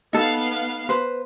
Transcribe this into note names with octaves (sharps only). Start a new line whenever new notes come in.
B3 D#4 A4 F5
B4 C5